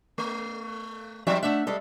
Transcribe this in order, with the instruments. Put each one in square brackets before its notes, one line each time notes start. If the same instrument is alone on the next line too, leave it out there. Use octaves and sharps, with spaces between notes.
[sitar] A3
[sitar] F3 D#4 E5 [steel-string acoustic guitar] G3 C4 G5
[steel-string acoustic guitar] A3 D4 F#5 [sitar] E5
[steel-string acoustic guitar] G3 G#3 A4